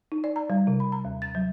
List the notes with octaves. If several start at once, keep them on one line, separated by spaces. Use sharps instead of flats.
D#4
D5
A#5
G3
C3
B5
A#5
D#2
A6
F#3